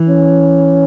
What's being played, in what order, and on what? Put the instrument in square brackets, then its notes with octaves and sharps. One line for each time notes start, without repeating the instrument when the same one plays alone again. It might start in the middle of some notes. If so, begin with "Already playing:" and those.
Already playing: [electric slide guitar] E3
[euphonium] C#4